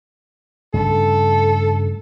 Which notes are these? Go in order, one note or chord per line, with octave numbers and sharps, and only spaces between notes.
G2 C#3 A3 A4